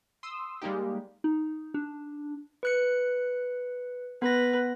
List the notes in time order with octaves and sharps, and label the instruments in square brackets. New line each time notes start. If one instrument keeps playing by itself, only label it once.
[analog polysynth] C6 D#6 E6
G3 G#3 A#3 D#4 G4
[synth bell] D#4
D4
[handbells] B4 F#6 C#7
[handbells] B3 A#6 [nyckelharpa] B4